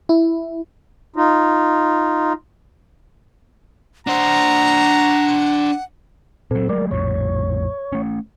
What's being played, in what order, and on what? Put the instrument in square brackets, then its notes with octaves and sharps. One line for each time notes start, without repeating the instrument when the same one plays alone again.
[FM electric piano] E4
[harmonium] D#4 F4
[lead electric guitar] D4 C5 [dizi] F#5 [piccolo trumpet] A#5
[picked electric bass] A#2 F#3 [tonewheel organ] C4 A4
[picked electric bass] F#3 G#3 A3 [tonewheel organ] A#4 D5
[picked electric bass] A#1 F2 A2 [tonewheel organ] C#5
[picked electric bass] A3 C#4